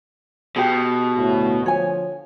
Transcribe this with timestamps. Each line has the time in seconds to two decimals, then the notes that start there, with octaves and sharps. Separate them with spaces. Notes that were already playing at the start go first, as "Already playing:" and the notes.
0.56 B2 G4 G#4
1.17 D2 A2
1.66 D3 F3 C#5 G#5